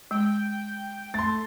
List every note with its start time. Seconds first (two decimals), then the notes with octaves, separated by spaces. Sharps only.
0.11 G#3 G5
1.14 A3 C6 A6